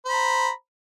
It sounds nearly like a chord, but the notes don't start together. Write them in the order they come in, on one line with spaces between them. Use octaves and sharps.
C5 B5 A#5